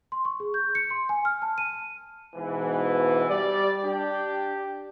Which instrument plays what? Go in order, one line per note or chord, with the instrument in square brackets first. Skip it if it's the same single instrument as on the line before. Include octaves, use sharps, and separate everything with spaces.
[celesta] C6
C#6
G#4
G6
C#7
C6
G#5
F6
A5
D#7
[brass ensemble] G#2 B2 E3
G3 D5
D4 G4